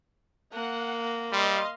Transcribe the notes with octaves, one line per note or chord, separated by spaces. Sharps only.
A#3 F#5
G3 D#5 F5 C6